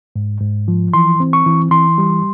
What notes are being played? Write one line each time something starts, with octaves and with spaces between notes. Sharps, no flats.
G#2
G#2
F3
E3 C6
C4
C#6
E3
E3 C6
G3